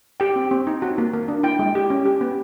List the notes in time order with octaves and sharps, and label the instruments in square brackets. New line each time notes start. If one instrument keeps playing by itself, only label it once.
[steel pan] G4 G5
C4
C4
D#4
F#4
A#3
A#3
D4
E4 G5
G#3
G4
C#4
G4
B3